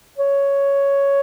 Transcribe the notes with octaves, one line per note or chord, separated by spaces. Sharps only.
C#5